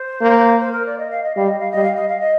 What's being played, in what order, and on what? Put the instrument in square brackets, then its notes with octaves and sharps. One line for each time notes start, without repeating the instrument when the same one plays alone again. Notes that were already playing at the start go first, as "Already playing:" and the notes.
Already playing: [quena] C5
[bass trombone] A#3
[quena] C5
A#4
D5
D#5
F5
D#5
[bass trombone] G3 [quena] F5
[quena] D#5
F5
[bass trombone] G3 [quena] D#5
[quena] F5
D#5
F5
D#5